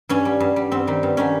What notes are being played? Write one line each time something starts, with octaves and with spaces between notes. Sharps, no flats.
G2 C#4
G3
G2
G3
G2 C4
D#3 G3
G2
D#3 G3 C#4